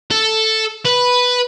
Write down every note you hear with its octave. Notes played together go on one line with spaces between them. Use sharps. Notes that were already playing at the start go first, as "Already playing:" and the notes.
A4
B4